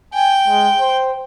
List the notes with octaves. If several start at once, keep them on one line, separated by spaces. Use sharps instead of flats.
G5 G#5
G#3
C5